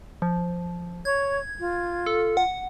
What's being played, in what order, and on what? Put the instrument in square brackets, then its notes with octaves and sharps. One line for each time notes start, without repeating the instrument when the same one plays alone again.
[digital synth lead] F3
[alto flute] C#5 [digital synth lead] G#6
[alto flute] F4
[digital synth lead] A4
F#5